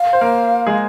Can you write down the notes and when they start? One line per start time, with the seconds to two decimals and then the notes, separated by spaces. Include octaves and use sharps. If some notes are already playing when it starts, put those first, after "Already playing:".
Already playing: F5
0.13 C5
0.21 A#3 A#4
0.67 G#3 G#4